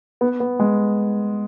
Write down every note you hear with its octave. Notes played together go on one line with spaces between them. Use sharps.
B3
B3
G#3